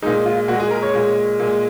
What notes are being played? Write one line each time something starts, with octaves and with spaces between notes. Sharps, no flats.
A#2 G#3 D#4
F4
A#2 G#3 F#4
G#4
A#4
C#5
A#2 G#3
A#2 G#3